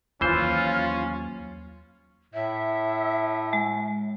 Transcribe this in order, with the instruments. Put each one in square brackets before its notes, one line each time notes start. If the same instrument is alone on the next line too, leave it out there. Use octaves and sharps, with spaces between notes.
[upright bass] D#2 F#3 [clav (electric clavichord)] E3 C5 [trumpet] C#4 [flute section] F4
[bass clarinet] A2 [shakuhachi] E5
[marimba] G#3